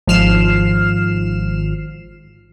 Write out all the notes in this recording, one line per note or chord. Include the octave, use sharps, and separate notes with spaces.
G#1 F3 F6 C7 E7